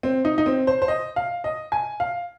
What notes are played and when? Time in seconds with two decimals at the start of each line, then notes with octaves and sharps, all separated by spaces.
0.03 C4
0.25 D#4
0.38 D#4
0.46 C4
0.67 C5
0.82 C5
0.88 D#5
1.16 F5
1.44 D#5
1.72 G#5
2.00 F5